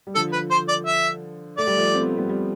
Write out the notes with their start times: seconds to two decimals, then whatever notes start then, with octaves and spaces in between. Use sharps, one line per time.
0.07 G3
0.15 D3 F3 A4
0.33 B4
0.51 C5
0.69 D5
0.87 E5
1.58 A3 D5
1.67 G3
1.77 F3 A3
1.93 C4
2.02 B3
2.09 A3
2.17 G3 B3
2.28 G3 B3